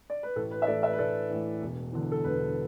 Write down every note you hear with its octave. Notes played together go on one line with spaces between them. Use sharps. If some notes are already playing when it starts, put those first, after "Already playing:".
D5
B4
A1 A4
B4
E5
A2 E3 A4 D5
B4 E5
B4
A1 A4 D5
A2 E3
E1
E2 D3
A4
E1 B4